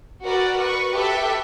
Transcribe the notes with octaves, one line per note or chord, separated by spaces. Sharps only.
F#4 A#4 B4 D5
B4 C#6
G4 A4 B4 E5 G5